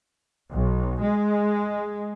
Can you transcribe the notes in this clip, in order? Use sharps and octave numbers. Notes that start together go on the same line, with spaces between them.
B1
G#3